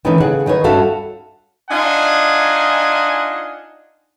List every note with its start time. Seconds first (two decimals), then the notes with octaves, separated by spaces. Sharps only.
0.05 D#3 E3 A3 B3 C#4 D#4
0.20 C#3 G#4 F#5
0.46 D#3 D#4 B4 C#5
0.64 G2 C#4 F#4 A4 E5 F5
1.70 D4 D#4 F4 D#5 F#5 G#5